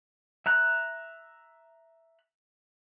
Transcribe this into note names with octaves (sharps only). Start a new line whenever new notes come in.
E5 A#5 F#6